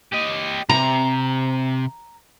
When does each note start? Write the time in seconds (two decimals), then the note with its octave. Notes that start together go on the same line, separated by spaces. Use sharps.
0.12 G4 D#5
0.69 C3 A#5